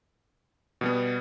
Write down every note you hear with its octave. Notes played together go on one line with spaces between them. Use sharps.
B2 G3 B3